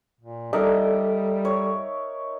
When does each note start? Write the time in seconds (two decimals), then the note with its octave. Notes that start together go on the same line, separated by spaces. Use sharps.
0.21 A#2
0.53 G3 D#4 A4 A#4 D5 E5
1.45 C#5